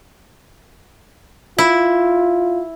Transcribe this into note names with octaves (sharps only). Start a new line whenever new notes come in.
E4 F4